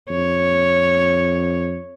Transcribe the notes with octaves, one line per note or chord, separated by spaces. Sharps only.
F2 C#5